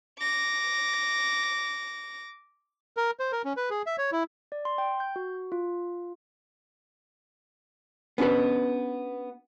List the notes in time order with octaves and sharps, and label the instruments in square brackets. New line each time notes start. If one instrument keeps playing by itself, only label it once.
[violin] D6 A#6
[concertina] A#4
C5
A#4
C#4
B4
G#4
E5
C#5
E4
[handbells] D5
C6
G5
G6
F#4
F4
[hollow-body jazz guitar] B3 C#4 D4 F#4 B4